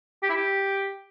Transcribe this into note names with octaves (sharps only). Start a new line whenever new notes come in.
G4
E4
G4